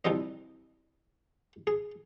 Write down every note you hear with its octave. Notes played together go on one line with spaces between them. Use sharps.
C2 F3 G3 C4 D#5
G#4